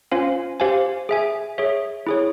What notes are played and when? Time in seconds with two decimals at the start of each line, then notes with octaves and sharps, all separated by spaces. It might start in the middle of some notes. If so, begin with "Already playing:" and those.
0.12 C#4 F4 C5 F5 G#5
0.60 G4 C5 F5 G#5
1.09 G#4 E5 G#5
1.58 G#4 C#5 E5
2.07 E4 G#4 C#5